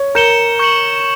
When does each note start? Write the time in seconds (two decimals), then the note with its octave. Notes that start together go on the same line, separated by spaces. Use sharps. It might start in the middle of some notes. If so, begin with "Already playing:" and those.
Already playing: C#5
0.15 A#4 G6 C#7 E7 G7
0.59 C#6 G6 C#7 F#7